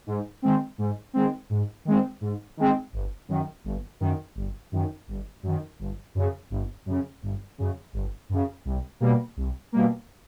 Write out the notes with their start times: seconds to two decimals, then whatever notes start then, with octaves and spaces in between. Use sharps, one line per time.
0.07 G#2
0.42 D#3 G#3 C4
0.78 G#2
1.14 D#3 G#3 C4
1.50 G#2
1.85 D#3 G#3 C4
2.21 G#2
2.57 D#3 G#3 C4
2.93 G1
3.28 F#2 D#3
3.64 G1
4.00 F#2 D#3
4.35 G1
4.72 F#2 D#3
5.08 G1
5.43 F#2 D#3
5.79 G1
6.15 F#2 C#3
6.50 G1
6.86 F#2 C#3
7.22 G1
7.58 F#2 C#3
7.93 G1
8.29 F#2 C#3
8.65 C2
9.00 B2 G3 A#3
9.37 C2
9.72 B2 G3 A#3